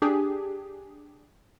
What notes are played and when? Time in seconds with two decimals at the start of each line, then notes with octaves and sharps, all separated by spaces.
0.02 D4 G4 G#4